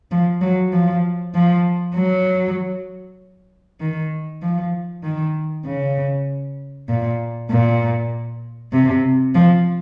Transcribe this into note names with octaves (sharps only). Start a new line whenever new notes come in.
F3
F#3
F3
F3
F#3
D#3
F3
D#3
C#3
A#2
A#2
C3
F3